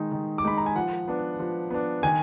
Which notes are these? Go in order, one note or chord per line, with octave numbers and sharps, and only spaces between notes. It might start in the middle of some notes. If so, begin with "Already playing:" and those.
Already playing: D#3 G#3 D#4
D#3
D6
G#3 D#4 B5
A#5
G#5
F3 F#5
B3 D4
F3
B3 D4
D#3 G#5